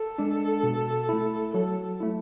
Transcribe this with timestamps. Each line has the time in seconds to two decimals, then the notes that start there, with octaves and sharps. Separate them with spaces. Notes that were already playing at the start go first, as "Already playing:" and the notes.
Already playing: A4
0.18 G#3 D4
0.63 B2
1.09 A3 E4
1.54 F#3 A4
2.00 A3 E4